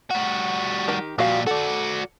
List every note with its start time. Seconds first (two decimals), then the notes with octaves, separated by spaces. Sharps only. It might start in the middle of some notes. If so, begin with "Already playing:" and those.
0.11 G3 F#4
0.88 D#3 G4
1.18 A#2 F3 G3 F#4 F5
1.47 F#4 A4 D5